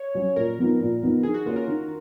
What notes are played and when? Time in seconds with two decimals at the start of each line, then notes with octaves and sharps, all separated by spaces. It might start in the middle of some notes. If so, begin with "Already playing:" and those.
Already playing: C#5
0.14 F#3 C#4
0.36 A#2 A#4
0.59 F3 B3 D#4
0.81 A#2
1.03 F3 B3 D#4
1.23 D#3 G#4
1.34 F#4
1.46 A#3 C#4 F4
1.56 A#4
1.67 D#3